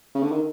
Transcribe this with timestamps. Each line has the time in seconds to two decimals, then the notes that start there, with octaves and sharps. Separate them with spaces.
0.15 C#3
0.23 D3
0.32 D#3